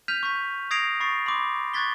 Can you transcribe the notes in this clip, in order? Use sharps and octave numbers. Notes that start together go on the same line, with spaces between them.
F6 G6 B6 D#7 F7
C#6 G6 B6
D#6 G#6 A#6 C7 D7 F7
B5 C#6 A6 C7
B5 C6 D6
C#6 F#6 G#6 A6 B6 G7